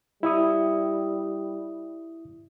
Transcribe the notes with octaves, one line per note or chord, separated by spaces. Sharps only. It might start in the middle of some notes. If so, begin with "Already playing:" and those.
G3 E4 E5 D#6